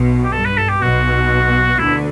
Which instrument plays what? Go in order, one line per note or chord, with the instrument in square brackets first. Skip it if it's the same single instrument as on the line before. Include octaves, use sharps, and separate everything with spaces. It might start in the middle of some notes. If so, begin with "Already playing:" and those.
Already playing: [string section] B1 B2
[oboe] G4
[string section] G2 [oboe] A4
[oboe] B4
A4
G4
[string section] B1 B2 [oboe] F#4
[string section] D2 D3 [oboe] E4